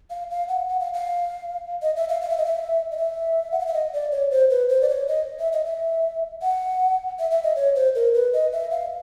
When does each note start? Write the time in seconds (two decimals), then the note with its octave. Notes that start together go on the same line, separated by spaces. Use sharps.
0.10 F5
0.30 F5
0.48 F#5
0.68 F#5
0.80 F5
0.93 F5
1.82 D#5
1.96 E5
2.09 F5
2.22 F5
2.30 E5
2.37 D#5
2.45 E5
2.91 D#5
2.97 E5
3.52 F#5
3.60 F5
3.67 E5
3.74 D#5
3.93 D5
4.12 C#5
4.31 C5
4.50 B4
4.69 C5
4.82 D5
4.89 C#5
5.08 D#5
5.39 E5
5.53 D#5
5.66 E5
6.42 F#5
7.19 E5
7.31 E5
7.44 D#5
7.56 C#5
7.76 C5
7.95 A#4
8.14 B4
8.33 D#5
8.53 E5
8.71 F5